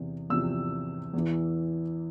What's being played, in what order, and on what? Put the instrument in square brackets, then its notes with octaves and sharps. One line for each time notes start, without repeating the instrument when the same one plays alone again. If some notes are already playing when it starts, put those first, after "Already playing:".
Already playing: [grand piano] E2 C3
E2 C3 F3 E6
E2 E3